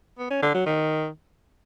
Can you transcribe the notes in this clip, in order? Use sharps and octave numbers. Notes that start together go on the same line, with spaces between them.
B3
C#4
D3
F#3
D#3